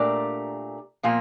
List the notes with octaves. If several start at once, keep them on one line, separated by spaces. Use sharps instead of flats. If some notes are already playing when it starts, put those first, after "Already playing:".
Already playing: A#2 A3 D4 G4 A#4
A#2 F3 A#3 F4